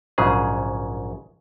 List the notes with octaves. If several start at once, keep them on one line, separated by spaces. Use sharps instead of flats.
A#1 G#2 C#3 F#3 G#4